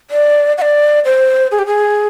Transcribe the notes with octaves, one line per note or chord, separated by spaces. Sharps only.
D5
F#5
D5
C5
G#4
G4
G#4